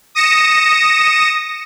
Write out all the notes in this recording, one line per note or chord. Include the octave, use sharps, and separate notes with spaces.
D#6 A#6 C#7 E7